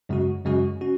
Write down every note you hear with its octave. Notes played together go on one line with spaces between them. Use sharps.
F#2 C#3 G#3 C#4 F#4
F#2 C#3 G#3 C#4 F#4
C#4 F#4